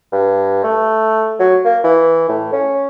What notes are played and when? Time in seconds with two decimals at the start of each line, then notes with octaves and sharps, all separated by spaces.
0.12 G2
0.64 A3
1.39 F#3
1.65 A#3
1.84 E3
2.29 A2
2.52 C#4